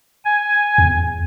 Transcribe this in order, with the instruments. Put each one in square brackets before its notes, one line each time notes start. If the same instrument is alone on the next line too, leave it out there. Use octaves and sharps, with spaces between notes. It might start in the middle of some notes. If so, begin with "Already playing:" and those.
[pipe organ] G#5
[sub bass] E2